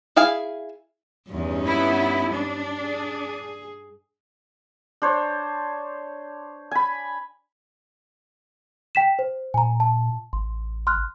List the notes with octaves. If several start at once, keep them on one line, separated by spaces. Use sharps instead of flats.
E4 G#4 F5 G#5
E2 G2 C#4 D#4
B3 E4
D4
G#4
D4 C5 C#5
G#5 B5
G5 B6 E7
C5
A#2 G#5 A#5
A5
A1 C6
C6 F6 F#6